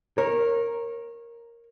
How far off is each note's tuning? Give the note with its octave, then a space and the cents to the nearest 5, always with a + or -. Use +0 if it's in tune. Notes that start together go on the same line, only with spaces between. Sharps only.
A#4 +0 C#5 -25